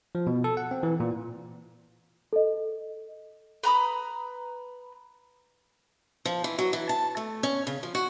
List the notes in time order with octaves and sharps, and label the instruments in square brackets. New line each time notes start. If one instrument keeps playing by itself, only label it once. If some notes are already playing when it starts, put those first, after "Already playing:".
[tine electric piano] F3
B2
A4
F#5
C4
E3
A#2
[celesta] A4 D#5
[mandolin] B4 A#5 B5 D#6
[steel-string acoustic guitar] F3
E3
F#3
E3
A5
A3
C#4
C#3
F3
F#4